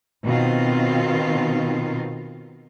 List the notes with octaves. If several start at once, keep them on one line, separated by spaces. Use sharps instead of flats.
B2 D#3 C4 F4